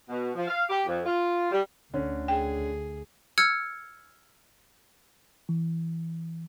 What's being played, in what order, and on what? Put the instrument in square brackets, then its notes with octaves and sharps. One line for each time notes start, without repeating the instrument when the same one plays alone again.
[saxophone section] B2
F3
F5
G4
F2
F4
G3
[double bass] D2 [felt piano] D3 C#4 C#5
[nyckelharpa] G#4 [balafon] G5
[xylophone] E6 F6 G#6 C#7
[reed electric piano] E3